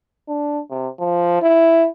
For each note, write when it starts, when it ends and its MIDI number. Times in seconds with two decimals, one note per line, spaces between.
0.28 0.60 62
0.70 0.88 48
1.00 1.41 53
1.42 1.87 64